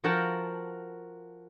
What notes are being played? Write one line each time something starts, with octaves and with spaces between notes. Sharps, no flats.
F3 F#4 A#4 F#5 G5 A5